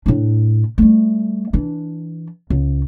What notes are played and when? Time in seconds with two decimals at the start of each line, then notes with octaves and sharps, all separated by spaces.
0.06 A2 D4
0.78 G3 A3
1.53 E3 D4
2.50 C#2